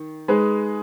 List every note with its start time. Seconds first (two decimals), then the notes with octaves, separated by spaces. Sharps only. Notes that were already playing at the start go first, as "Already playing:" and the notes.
Already playing: D#3
0.28 G#3 D#4 G#4 B4